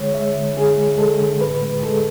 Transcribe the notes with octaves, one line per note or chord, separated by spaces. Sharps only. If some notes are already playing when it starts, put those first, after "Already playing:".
Already playing: D3 G#3 C#5
G#3 E5
D3
D3 G#4
G#3
G#3 A4
D3
A2 B4
G#3
G#3 A4